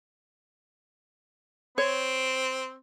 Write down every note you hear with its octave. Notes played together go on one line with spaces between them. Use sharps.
C4 C#5